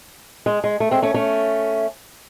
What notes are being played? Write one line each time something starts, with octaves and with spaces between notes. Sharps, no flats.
G#3
G#3
A3
G#3 C4
A3 C#4
A3 C#4